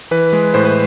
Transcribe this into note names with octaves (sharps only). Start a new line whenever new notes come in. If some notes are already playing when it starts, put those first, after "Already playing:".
E3 B4
G#3
A2 C5
B4